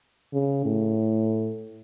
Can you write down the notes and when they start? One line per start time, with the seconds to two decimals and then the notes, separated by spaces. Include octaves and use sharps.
0.34 C#3
0.66 A2